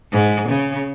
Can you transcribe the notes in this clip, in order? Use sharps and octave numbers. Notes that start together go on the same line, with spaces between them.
G#2
C#3